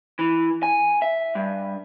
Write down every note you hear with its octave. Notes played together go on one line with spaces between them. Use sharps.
E3
G#5
E5
G2